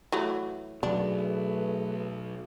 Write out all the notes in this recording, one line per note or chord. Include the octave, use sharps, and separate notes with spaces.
E3 F#3 A3
B2 F#3 A3 D4 G#4 B4